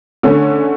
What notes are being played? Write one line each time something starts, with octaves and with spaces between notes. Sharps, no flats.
D3 A3 C#4